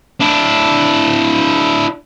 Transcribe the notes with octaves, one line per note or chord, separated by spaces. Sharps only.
D4 E4